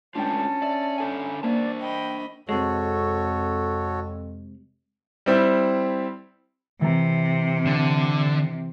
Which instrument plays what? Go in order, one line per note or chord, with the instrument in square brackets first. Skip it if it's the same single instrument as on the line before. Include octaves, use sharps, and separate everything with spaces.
[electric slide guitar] G#3 A3 F4 [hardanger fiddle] C#4 [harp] D4 G5 [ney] A5
[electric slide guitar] D5 [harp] E5
[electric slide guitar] D4 A4 G#5
[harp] A#3 [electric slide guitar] D4 C5 A5 [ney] D5
[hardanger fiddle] D#5 B5 [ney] G5
[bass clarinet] F2 [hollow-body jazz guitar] C3 G#3 [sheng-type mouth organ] F#4 A4 C#5
[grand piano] G3 C4 E4
[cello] C3 [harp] E3 A#5
[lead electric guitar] D3